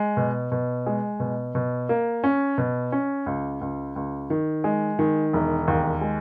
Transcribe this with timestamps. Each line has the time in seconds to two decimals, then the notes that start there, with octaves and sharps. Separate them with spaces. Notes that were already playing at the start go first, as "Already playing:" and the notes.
Already playing: G#3
0.17 B2
0.52 B2
0.86 G#3
1.20 B2
1.55 B2
1.89 A#3
2.24 C#4
2.58 B2
2.92 C#4
3.26 C#2
3.61 C#2
3.96 C#2
4.30 D#3
4.64 G#3
4.99 D#3
5.33 E1
5.68 D#2
6.01 G#3